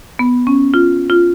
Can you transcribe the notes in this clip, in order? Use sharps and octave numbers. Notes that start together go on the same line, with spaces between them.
B3
C#4
F4
F4